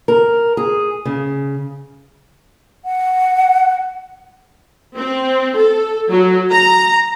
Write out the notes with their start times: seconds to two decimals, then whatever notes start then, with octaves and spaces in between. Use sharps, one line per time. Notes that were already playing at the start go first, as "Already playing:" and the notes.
0.08 A#4
0.57 G#4
1.05 C#3
2.85 F#5
4.96 C4
5.56 A4
6.10 F#3
6.50 A#5